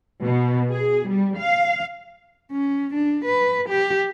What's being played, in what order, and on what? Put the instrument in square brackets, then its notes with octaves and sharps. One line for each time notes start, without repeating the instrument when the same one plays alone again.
[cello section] B2
G#4
G3
F5
[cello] C#4
D4
B4
G4